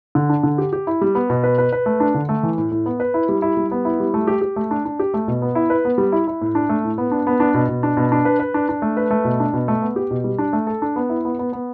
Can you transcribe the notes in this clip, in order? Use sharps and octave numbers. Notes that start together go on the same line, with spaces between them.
D3
D4
D3
G4
G4
E4
G3
B3
B2
B4
B4
B4
A3
D4
D3
A3
E3
A2
A2
B3
B4
E4
G3
E4
G3
B3
E4
G3
A3
G4
G4
A3
D4
D4
G4
A3
B2
B3
E4
B4
B3
G3
E4
E4
A2
D4
A3
A2
B3
D4
B3
D4
B2
B2
D4
B2
D4
B4
B4
D4
D4
A3
B4
A3
B2
D4
B2
A3
B3
G4
B2
G3
D4
A3
A4
D4
B3
E4
B3
B3
B3